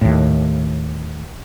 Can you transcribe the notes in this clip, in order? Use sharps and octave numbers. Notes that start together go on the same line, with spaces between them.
D#2 A2